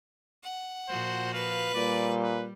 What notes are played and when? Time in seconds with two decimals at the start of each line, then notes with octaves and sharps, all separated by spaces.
0.43 F#5
0.88 A#2 F3 F#4 C5
1.34 B4 F5
1.75 A#2 G3 D5
2.23 B4